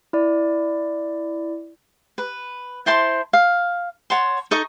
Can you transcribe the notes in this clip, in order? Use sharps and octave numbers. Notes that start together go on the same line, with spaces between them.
E4 D5
B4
E4 C5 A5 C6
F5
C#5 F#5 A5 C6
D#4 A4 D#5 C#6